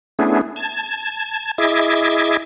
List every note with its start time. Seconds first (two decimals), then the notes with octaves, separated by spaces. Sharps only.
0.19 A3 B3 C#4 D4 E4 G#4
0.56 A5 G#6
1.58 E4 G#4 D#5 E5 D6 G#6